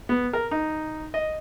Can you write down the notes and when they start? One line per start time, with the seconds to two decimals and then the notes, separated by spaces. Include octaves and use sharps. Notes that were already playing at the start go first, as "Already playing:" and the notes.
0.09 B3
0.33 A#4
0.51 D#4
1.14 D#5